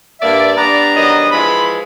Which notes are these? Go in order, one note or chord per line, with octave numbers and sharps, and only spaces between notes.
G2 A#3 D5 E5
G3 B3 D4 A#5
D#3 F#3 D#5
E3 F3 G#3 B5